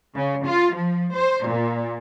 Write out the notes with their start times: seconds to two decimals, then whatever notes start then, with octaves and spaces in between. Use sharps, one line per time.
0.15 C#3
0.46 F4
0.75 F3
1.14 C5
1.46 A#2